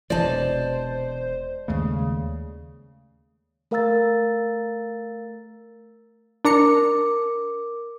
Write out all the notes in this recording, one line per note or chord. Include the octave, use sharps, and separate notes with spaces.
E1 C3 E3 C5 D5 D#5 A5
D#2 C#3 G#3 A3
A3 A#4 F5 A#5 E6 A6
D4 A#4 A#5 D6 C#7